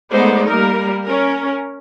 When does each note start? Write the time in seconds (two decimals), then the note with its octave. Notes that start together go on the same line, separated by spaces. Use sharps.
0.11 G#3 A3 B3 D#4 C5 D5
0.47 G3 A#3 A#4
1.04 C#4 A#4